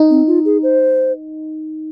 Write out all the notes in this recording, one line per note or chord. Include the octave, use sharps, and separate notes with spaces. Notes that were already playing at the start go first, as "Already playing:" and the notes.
Already playing: D#4
C4
F4
G#4
C5